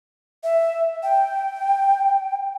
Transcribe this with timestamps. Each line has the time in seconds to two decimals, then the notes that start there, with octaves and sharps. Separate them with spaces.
0.44 E5
1.03 G5